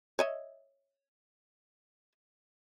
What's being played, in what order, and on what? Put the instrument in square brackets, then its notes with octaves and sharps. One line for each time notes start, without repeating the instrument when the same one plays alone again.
[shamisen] C#5 D#5 E5